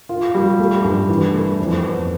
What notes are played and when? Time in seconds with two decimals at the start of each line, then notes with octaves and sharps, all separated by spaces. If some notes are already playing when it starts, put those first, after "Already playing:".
0.09 F4
0.35 G3
0.59 A3
0.84 G2
1.09 E3
1.33 A3
1.59 F2
1.83 B3